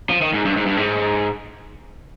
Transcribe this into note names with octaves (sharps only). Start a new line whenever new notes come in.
F3
D#3
G#2
G2
G#2
G2
G#2